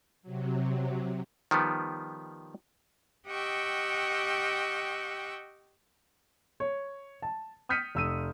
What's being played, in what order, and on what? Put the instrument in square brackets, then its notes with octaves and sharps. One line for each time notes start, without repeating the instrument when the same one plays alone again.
[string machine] C3 F#3
[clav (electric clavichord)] D#3 F3 G3 B3
[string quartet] G4 D#5 F#5 G5 C#6 E6
[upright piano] C#5
A5
D#6 F6 G6 B6 C#7 D#7
F1 E6 D#7